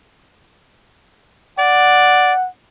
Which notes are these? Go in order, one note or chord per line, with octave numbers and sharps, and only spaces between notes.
D5 F#5